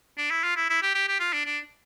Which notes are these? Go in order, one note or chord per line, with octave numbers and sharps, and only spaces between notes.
D4
E4
F4
E4
E4
G4
G4
G4
F4
D4
D4